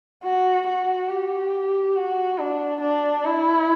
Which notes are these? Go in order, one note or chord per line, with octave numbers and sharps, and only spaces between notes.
F#4
F#4
G4
F#4
D4
D4
E4